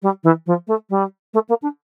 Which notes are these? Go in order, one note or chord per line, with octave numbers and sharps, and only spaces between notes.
G3
E3
F3
A3
G3
A3
A#3
D4